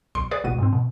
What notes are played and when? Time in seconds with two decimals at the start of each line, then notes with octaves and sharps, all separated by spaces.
0.15 B1 C6 C#7 D7
0.31 G#4 B4 D5
0.44 G#1 C#2 B2 B3 F#4 D#7
0.59 G#2 C4
0.73 B2